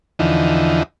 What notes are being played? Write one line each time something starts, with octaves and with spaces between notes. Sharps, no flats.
E2 D3 E3 F3 D#4